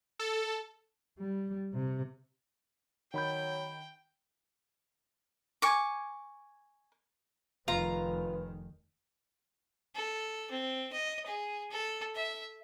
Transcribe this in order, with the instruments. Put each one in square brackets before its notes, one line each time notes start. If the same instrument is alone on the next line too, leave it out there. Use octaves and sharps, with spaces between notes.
[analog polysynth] A4
[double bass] G3
C3
[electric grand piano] D#3 B5 G6 [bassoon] F#3 [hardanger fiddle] G5
[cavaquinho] G#5 C#6 D6
[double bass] F1 D#3 [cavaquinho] F4 [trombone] B4 [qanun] A#5
[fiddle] A4
C4
D#5
G#4
A4
E5